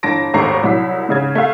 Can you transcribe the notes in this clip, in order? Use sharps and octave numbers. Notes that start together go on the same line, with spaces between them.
G1 E3 A5 A#6 D7
G#1 D#2 A3 A#5 C#6 C7
C2 F#3 E4 B6
G#2 C#3 G#6
A3 F5